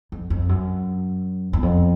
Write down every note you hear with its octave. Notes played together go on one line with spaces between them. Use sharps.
F2
F2
F#2
E2
F2